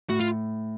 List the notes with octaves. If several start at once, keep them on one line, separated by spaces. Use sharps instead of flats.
A2 F#4
F4